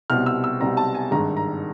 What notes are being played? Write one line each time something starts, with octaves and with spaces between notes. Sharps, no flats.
C2 B2 G3 C4 F6
E6
E6
C2 B2 G3 C4 A#5
A5
G#5
G#1 G2 D#3 G#3 A#5
A#5